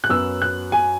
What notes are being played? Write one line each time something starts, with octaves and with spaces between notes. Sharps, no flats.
F#6
F#2 F#3 B3 E6
F#6
G#5